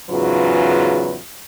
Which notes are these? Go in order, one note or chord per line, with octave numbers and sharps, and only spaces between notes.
E2 G#2 C#3 F#3 F4 B4